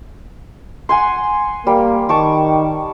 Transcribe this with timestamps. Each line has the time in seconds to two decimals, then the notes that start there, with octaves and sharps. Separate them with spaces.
0.89 F#5 G#5 C6
1.67 G3 A#3
2.09 D#3 A5 C#6 D6